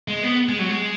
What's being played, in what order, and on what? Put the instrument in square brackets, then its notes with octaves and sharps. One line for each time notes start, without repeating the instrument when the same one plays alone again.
[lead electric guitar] G#3
B3
G#3
F#3
G#3